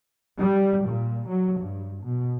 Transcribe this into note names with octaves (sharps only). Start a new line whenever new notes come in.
G3
A#2
F#3
G2
B2